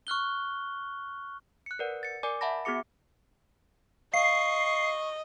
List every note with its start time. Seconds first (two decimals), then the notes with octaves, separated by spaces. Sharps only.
0.07 C#6 F6 F#6 G7
1.66 F#6 C#7
1.79 A#4 B4 D5 F#5
2.03 A6 C#7
2.23 A#4 D5 G#5 D6
2.41 E5 F#5 A5 B5 A#6
2.65 B3 F#4 G#4 D6 C#7
4.14 D#5 F5 C#6 C7